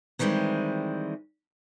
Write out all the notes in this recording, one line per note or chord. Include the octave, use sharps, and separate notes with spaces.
D#3 E3 G3 G#3 C4